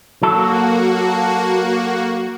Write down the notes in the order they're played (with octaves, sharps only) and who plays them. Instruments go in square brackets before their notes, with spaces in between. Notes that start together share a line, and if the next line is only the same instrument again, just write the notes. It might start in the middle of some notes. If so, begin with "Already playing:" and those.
[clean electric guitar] F#3 A4 [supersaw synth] A#3 F#4